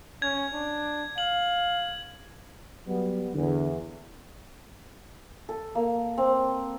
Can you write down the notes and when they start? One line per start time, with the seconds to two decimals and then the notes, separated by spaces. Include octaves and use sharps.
0.22 C#4 G#6
0.53 D4
1.18 F5 F#7
2.87 F#3 G3 B3
3.34 E2 D3
5.49 A4
5.75 A#3
6.18 C4